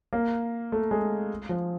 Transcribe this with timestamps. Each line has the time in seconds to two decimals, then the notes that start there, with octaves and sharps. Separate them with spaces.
0.13 A#3
0.72 A3
0.91 G#3
1.49 F3